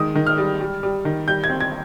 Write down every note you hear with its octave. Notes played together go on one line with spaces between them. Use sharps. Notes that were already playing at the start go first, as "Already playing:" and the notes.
Already playing: D#3 G#3 D#6
D#3
F6
G3
G3
G3
D#3
G3 G6
G#6
C4
G#6